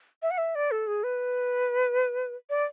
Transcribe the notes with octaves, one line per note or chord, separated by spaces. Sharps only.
E5
F#5
E5
D5
A4
G#4
B4
D5